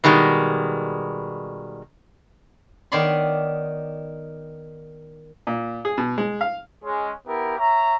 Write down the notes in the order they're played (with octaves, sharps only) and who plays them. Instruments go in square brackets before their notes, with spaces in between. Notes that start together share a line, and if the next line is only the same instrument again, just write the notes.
[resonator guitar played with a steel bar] B2 D#3 G3 G#3
[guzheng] D#3 B3 C#5 D5 B5 C6
[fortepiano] A#2
G#4
B2
G#3
F5
[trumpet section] G#3 C#4
B3 E4 G4 A#4
C#5 E5 A#5